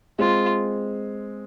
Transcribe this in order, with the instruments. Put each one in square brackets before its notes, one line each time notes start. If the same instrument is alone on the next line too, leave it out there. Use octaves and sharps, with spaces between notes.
[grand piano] G#3 C4 [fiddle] F4